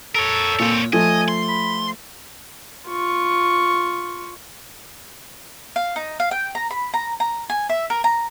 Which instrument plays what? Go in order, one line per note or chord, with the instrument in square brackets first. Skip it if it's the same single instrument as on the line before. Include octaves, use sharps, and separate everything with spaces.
[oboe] A4 [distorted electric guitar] A#4 C#5
[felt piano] A#2 [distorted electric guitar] C4 C#5
[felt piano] F3 A3 [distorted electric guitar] D#5 [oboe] G#5
[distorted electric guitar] C6
[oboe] B5
[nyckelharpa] F4 C#6
[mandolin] F5
D#4
F5
G5
A#5
B5
A#5
A#5
G#5
E5
A#4
A#5